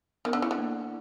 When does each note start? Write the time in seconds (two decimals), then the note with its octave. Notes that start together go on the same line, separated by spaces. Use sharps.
0.25 D#3 B3
0.33 D3
0.42 C#3 E4
0.51 D3
0.59 A#3
0.77 A#3